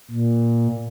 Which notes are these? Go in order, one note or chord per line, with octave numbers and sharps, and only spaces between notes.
A#2